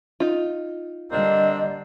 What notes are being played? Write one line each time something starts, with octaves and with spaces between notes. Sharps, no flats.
D#4 F4
D3 G3 A#3 C4 D4 D#5